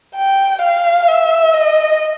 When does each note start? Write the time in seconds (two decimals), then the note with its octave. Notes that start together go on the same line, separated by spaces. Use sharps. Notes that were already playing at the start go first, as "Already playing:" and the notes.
0.15 G5
0.61 F5
1.08 E5
1.54 D#5